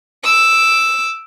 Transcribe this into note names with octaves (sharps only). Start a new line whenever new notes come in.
D6 E6